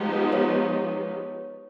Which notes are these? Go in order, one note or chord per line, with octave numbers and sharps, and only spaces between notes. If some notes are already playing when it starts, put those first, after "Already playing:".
Already playing: F3 G#3 B3 D#4 G4
C#5